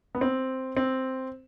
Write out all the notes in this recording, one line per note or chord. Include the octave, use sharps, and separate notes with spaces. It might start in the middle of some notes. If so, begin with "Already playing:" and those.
B3
C4
C4